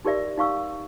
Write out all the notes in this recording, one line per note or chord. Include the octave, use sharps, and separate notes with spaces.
D#4 G4 A#4 D5 E5
D#4 F5 C#6 E6